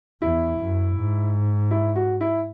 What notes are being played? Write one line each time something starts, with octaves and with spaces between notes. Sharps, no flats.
E2 E4
F#2
G#2
E4
F#4
E4